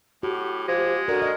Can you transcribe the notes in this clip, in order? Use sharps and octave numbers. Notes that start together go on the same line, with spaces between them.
A2 F#4 G4
F3 G#3
D3 F#4 A#4
D#5